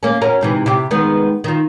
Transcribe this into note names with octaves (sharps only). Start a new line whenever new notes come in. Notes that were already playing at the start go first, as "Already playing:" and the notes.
A#3 C#4
C#4 F#4 A#4
G#2 C3 E3
C3 E4 G4
D#3 G#3 B3
D#3 F4